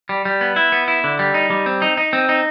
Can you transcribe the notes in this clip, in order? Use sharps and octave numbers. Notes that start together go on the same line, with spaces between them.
G3
G3
B3
E4
B3
E4
D3
G3
D#4
G3
C4
D#4
D#4
C4
D#4